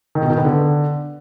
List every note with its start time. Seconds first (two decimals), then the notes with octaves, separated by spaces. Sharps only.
0.15 D#3
0.23 B2
0.30 D#3
0.37 B3
0.45 D3